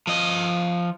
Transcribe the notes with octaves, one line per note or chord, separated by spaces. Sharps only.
F3 D#5